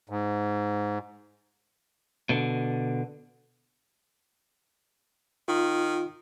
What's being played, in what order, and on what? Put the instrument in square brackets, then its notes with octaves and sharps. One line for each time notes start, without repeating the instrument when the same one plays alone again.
[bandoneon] G#2
[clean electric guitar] B2 D3
[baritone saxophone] D#3 [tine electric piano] F4